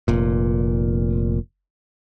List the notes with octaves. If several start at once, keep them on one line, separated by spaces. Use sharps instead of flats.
F1 A#2